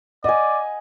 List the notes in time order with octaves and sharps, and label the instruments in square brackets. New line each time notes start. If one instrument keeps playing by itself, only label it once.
[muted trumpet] D5 [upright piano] D#5 [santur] F#5 G#5